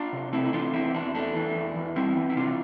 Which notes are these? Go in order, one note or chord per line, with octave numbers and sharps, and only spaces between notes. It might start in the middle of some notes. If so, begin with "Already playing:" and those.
Already playing: D4 F4
C3
A3 C4 E4
E4
E3 D4 F4
E2 C4 E4
E2 D4
A3 D4
E3
E2
E2
G3 C4 E4
E3
E4
C3 D4 F4